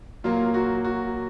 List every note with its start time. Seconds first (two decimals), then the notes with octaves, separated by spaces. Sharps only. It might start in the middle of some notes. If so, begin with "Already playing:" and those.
0.24 A#2 F#3 A#3 F4
0.54 F#4
0.85 F#4